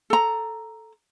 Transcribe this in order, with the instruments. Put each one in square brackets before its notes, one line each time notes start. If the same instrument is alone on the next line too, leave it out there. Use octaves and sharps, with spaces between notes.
[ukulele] A4 A#5